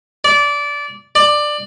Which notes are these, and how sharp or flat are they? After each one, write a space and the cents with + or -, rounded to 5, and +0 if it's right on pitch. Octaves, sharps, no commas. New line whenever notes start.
D5 -20
D5 +15